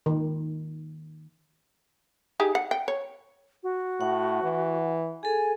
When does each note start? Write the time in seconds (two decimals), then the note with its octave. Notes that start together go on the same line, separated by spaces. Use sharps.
0.06 D#3
2.40 D#4 G4 G#4
2.55 F#5
2.71 G5
2.88 C#5
3.63 F#4
4.01 A2 F#5
4.43 E3
5.23 G#4 A4 G#5